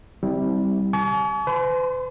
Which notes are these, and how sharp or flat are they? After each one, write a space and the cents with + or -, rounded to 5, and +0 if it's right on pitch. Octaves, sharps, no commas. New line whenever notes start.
G3 +0 C4 +0 E4 -35
G#5 +45 C#6 +40
B4 +45 C6 -5